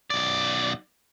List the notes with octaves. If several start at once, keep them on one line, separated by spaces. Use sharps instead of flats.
B1 D5